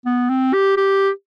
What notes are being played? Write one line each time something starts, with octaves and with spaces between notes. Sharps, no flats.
B3
C4
G4
G4